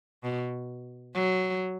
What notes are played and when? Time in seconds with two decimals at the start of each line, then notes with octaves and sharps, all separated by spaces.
0.24 B2
1.14 F#3